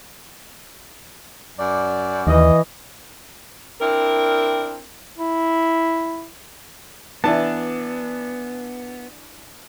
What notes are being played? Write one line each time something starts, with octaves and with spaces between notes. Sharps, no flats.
F#2 D5
D#2 E3 D#5
C4 D4 E4 A#4
E4
E3 B3 D4 A5